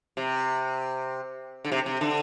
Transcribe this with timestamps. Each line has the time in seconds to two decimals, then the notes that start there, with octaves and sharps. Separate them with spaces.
0.17 C3
1.65 D3
1.72 C3
1.86 C3
2.01 D3